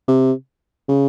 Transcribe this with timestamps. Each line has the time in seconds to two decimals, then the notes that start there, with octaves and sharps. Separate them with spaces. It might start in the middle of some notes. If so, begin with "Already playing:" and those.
0.08 C3
0.88 C#3